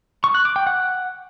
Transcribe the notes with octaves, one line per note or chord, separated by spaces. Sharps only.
C#6
F#6
D6
G5
F#5